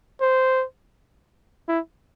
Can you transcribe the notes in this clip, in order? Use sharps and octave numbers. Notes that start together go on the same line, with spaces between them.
C5
E4